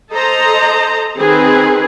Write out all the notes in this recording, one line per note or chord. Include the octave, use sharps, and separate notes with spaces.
A4 C5 D#5 A#5
D#3 C4 G#4 B4